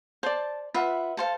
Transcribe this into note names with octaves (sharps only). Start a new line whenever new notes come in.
C5 D5 A5
F4 B4 E5 F#5
A4 C5 F5